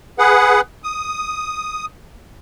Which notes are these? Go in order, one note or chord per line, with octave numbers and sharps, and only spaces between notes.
G#4 B4 F#5
D#6